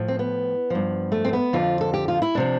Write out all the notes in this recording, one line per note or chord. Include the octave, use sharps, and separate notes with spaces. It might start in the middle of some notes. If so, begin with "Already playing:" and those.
Already playing: A2 F3
C4
B3
G2 F3
A3
C4
B3
F2 D3 F3 F4
A4
G4
F4
E4
C3 F3 D4